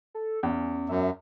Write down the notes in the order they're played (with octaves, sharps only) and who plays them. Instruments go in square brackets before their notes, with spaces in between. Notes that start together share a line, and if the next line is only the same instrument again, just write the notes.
[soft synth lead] A4
[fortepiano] E2 [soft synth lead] C#4
[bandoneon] F#2 [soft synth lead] E5